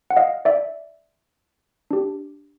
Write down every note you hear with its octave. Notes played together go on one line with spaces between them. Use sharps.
F#5
D#5 F5
D5 E5
D4 G4